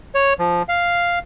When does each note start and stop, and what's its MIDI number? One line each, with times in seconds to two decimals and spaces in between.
0.15 0.33 73
0.39 0.62 53
0.69 1.19 77